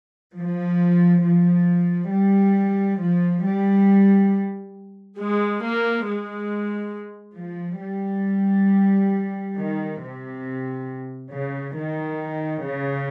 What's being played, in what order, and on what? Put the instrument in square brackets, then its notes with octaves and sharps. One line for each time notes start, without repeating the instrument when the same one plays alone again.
[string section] F3
F3
G3
F3
G3
G#3
A#3
G#3
F3
G3
D#3
C3
C#3
D#3
C#3